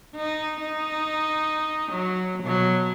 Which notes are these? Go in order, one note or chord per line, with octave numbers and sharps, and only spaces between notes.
D#4
D#4
F#3
B2 F#3